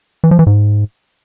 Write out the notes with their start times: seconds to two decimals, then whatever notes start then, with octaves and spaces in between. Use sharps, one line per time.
0.24 E3
0.31 F3
0.39 E3
0.47 G#2